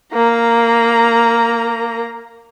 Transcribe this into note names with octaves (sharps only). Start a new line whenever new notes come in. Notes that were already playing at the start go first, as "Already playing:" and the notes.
A#3 A#5